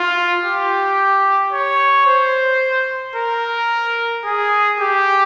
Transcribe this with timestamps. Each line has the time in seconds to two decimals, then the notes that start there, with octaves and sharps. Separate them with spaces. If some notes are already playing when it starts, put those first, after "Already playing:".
Already playing: F4
0.43 G4
1.52 C#5
2.06 C5
3.16 A#4
4.25 G#4
4.80 G4